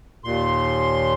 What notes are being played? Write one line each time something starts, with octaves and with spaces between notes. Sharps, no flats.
D#2 A#2 C6